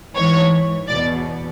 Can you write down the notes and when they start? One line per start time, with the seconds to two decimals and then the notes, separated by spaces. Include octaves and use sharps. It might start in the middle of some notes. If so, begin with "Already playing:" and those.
0.15 G#2 E3 C#5
0.88 E2 B2 D5